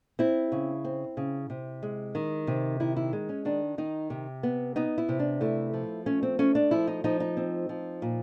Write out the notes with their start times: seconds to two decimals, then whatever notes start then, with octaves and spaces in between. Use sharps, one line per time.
0.19 C4 E4
0.52 C#3
0.85 C4
1.17 C#3
1.50 C3
1.83 G#3
2.15 D#3
2.47 C3
2.80 D#3 E4
2.96 E4
3.13 G#3
3.29 C#4
3.45 D#3 D4
3.78 D#3 D#4
4.10 C3
4.43 B3
4.76 B3 D#4
4.98 E4
5.09 C3
5.19 D4
5.41 A3 E4
5.73 F3
6.06 A3 C#4
6.23 C4
6.39 A3 C#4
6.55 D4
6.71 F3 E4
6.87 D#4
7.04 F3 D#4
7.20 D#4
7.37 C4
7.69 F3
8.02 A#2